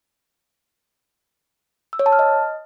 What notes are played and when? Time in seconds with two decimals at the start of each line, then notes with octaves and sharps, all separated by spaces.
1.93 E6
1.99 C#5
2.06 A5
2.13 F6
2.19 D#5